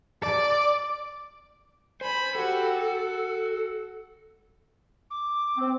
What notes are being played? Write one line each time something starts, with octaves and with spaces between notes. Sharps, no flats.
D5 D6
C5 G#5 B5
F#4 G4 A4
F#4
D6
C4